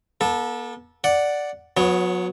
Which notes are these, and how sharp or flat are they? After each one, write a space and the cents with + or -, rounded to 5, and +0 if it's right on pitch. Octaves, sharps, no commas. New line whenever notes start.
B3 -45 A4 -5
D5 +0 F#5 +0
F#3 -35 B3 +0 C#5 +5